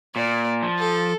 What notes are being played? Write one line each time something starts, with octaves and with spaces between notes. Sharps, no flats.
A#2 D5
F3
A4